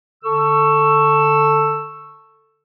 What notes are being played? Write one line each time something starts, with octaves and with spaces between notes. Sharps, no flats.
D3 A4 C#6 E6